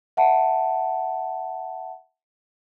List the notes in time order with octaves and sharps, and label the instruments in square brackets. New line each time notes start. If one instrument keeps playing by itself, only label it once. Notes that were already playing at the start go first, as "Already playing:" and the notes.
[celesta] E5 F#5 A5